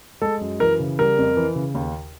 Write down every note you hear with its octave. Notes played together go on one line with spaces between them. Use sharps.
G#3 A4
F#2
E3 A#4
C#3
G3 A#4
F2
E3
C#3
D#2